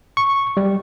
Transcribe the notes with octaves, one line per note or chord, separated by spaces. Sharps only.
C#6
G3